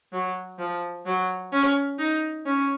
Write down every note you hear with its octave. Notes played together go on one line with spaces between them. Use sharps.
F#3
F3
F#3
C#4
D#4
C#4